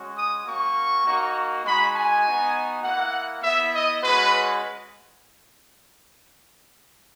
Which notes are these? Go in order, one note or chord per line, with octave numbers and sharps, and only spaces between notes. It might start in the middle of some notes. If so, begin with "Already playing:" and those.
Already playing: G#3 C#4 F#4
D#6
A#3 C#4 F#4 C#6
A#3 D#4 F#4
G#3 D#4 F#4 B5
G#5
B3 D#4 F#4
A#3 E4 F#5
B3 E4 E5
D#5
G#3 C#4 F#4 B4